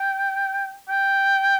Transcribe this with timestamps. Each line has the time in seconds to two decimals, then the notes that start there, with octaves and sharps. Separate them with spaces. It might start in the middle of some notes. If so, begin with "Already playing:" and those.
Already playing: G5
0.89 G5